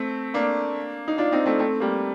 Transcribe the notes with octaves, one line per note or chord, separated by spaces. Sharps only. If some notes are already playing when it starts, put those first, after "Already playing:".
Already playing: A3 C4
A#3 D4
D#4
D4 F4
C4 D#4
A3 C4
A3 C4
G3 A#3